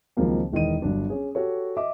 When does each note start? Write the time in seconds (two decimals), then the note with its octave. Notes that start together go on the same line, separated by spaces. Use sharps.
0.17 C#2 D#3 F3 F#3 A#3 C4
0.52 E1 D#3 E3 D#5 D#7
0.82 G1 F#3 D4
1.10 C#4 G#4
1.35 F#4 G4 A4 C#5
1.77 D#5 E5 D6